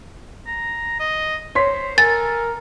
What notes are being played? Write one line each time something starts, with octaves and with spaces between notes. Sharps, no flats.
A#5
D#5
C5 C#5 C6 B6
A4 A#4 G#5 A6